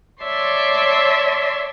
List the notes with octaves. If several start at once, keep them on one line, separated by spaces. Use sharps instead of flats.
C#5 D5 E5 A5 C6